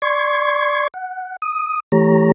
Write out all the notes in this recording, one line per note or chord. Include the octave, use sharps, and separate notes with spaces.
D5 C6 C#6 G#6
F#5
D#6
E3 A3 G4 C#5 A#5